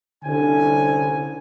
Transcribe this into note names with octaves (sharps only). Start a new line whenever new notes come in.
C2 D3 C#4 G#5